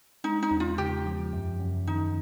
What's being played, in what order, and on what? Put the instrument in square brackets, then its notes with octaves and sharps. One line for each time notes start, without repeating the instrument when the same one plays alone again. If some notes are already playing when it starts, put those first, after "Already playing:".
[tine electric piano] G#3 [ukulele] D#4
[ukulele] D#4
[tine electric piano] E2
[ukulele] F4
[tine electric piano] C#3 [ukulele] G4
[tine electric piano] F3
F#2
F#2
[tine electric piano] D#3 [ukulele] D#4